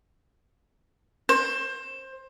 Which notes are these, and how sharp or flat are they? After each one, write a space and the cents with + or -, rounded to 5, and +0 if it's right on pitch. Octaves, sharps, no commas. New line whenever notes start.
C5 +20